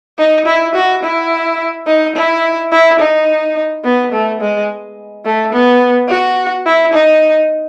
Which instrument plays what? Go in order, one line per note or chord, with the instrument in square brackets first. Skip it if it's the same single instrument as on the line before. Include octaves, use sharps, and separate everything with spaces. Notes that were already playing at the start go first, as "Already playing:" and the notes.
[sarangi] D#4
E4
F#4
E4
D#4
E4
E4
D#4
B3
A3
G#3
A3
B3
F#4
E4
D#4